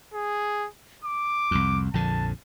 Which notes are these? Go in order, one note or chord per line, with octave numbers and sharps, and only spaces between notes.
G#4
D6
C2 F2
A#1 F2 D3 A5